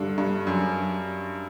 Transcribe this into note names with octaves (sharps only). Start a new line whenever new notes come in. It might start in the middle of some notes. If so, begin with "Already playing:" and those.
Already playing: G2 D3
G2
F#2